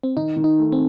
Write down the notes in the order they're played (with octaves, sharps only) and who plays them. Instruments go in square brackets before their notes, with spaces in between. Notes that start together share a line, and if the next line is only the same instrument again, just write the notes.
[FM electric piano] C4
[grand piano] D#3 [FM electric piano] D#4
[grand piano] D#3
[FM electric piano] D#4
[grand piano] A3
[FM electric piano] C4